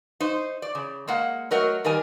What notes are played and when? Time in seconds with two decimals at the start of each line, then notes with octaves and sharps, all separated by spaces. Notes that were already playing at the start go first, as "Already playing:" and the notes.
0.20 D#4 C5
0.62 D5
0.75 C#3
1.08 G#3 A#3 F#5
1.51 F#3 A3 A#4 D#5 F#5
1.84 D#3 G3 A#4 D#5 G#5